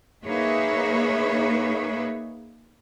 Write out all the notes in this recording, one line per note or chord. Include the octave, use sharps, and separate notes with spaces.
A#3 D#4 G#4 B4 C#5 E5